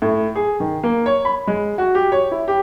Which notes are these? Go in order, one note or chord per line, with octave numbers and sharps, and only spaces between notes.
A2
G#4
D#3
A#3
C#5
B5
G#3
F#4
G4
C#5
E4
G4